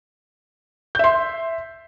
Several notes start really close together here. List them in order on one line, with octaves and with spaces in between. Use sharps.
G6 E5 C6